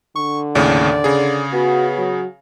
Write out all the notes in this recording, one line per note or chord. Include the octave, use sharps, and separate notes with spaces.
D3 C#6
D#2 A2 C#3 D5
C#3 G#4
B3 F#4
F#3